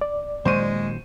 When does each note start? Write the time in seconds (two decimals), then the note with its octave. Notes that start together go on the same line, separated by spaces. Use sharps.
0.01 D5
0.45 A#2 D#3 F#3 G#3 C5 C#6 D#7